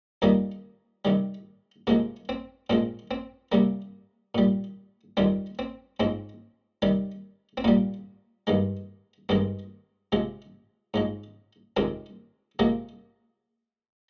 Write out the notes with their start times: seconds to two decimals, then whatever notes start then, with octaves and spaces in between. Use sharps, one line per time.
0.22 F2 D#3 G3 A#3
1.05 C3 D#3 G3
1.87 C3 F3 G#3 A#3
2.29 C4
2.70 A#2 F3 G#3 C4
3.11 C4
3.52 C3 G3 A#3
4.35 A#2 G3
5.17 F2 D#3 G3 C4
5.59 C4
6.00 G#2 F3 G#3 C4
6.82 C3 D#3 G3
7.57 C4
7.64 A#2 G3 A#3
8.47 G2 D#3 G#3
9.29 G2 D#3 G#3 C4
10.12 C3 F3 G#3
10.94 G#2 F3 G#3
11.77 F2 C3 D#3 G#3 C4
12.59 C3 F3 G#3 A#3